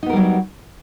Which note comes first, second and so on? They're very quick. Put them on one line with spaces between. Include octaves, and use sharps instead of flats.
D#4 B3 A#4 G3 F#3